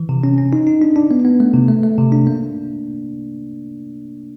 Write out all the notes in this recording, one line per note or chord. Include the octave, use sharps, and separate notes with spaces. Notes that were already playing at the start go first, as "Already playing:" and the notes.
Already playing: E3
C3
C#4
C#4
D#4
D#4
D4
D4
B3
B3
A3
C3
A3
A3
C3
D4
A#3